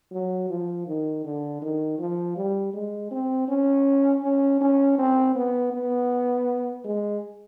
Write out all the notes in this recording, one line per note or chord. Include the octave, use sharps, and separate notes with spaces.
F#3
F3
D#3
D3
D#3
F3
G3
G#3
C4
C#4
C#4
C#4
C4
B3
B3
G#3